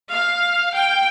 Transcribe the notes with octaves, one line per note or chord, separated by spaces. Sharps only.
F5
G5